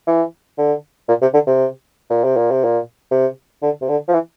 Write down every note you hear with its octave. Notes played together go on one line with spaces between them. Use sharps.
E3
D3
A#2
C3
D3
C3
A#2
C3
A#2
C3
A#2
C3
D3
C3
D3
F3
E3